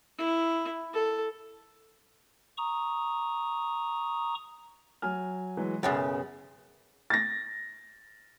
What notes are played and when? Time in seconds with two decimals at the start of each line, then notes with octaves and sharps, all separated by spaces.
0.18 E4
0.93 A4
2.58 A#5 C#6 D#6
5.02 F#3 G#5 F6
5.57 E3 F#3 G#3
5.83 B1 F#2 C#3 F#6 A6
7.10 A6 A#6